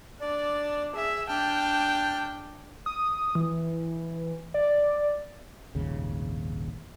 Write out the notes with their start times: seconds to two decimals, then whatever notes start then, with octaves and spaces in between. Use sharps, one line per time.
0.21 D4 D5
0.95 G#4 E5
1.28 D4 G5 A5 F6
2.86 D#6
3.35 E3
4.54 D5
5.75 D#1 G#1 D#2 C#3